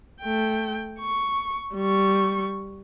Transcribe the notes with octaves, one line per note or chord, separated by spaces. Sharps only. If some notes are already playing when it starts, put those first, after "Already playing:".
A3 G5
C#6
G3 C#6